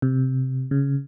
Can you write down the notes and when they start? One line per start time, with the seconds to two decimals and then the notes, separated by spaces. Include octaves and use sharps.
0.02 C3
0.71 C#3